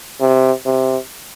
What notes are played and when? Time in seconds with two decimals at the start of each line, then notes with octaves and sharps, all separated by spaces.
0.20 C3
0.66 C3